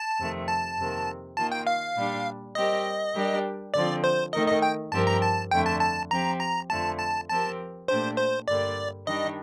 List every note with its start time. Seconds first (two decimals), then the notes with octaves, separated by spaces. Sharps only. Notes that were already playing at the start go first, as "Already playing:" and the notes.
Already playing: A5
0.19 F2 C3 D#3 A3
0.48 A5
0.78 F2 C3 D#3 A#3
1.37 D#3 A#3 F4 A5
1.52 G5
1.67 F5
1.96 A#2 G3 D4
2.55 G3 C4 G4 A#4 D#5
3.14 G3 D4 G4 A#4
3.74 D3 F3 C4 D5
4.04 C5
4.32 D#3 A3 D#4 A#4 D#5
4.48 D#5
4.62 G5
4.92 G2 F3 C4 G4 A#4 A5
5.07 A#5
5.22 A5
5.51 F2 D3 A3 D4 G5
5.66 A5
5.81 A5
6.10 F3 C4 G4 A#5
6.40 A#5
6.70 F2 D3 F3 A3 A5
6.99 A5
7.29 F3 C4 G4 A#4 A5
7.88 A#2 A3 D4 G4 C5
8.18 C5
8.48 G2 D3 G3 A#3 D5
9.06 D#3 G3 D4 D#5